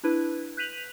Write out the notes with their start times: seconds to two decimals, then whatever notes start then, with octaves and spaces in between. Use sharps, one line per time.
0.03 D4 E4 B4
0.57 F#6 G6 B6 D#7 F7 F#7